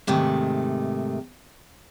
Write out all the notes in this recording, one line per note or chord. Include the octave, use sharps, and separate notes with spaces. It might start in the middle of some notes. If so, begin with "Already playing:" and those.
G#2 C3 D#3 A3